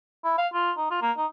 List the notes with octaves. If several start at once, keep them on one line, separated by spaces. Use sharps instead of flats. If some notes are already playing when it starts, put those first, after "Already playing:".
E4
F5
F4
D#4
F4
A#3
D#4